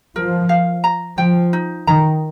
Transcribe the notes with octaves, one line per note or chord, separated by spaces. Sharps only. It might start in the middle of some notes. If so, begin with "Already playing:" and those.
F3 A#4
F5
A#5
F3 G5
D#4
D#3 A#5